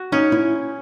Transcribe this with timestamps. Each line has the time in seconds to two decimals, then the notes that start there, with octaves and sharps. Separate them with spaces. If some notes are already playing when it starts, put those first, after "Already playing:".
Already playing: F#4
0.12 C#4 D#4
0.32 E4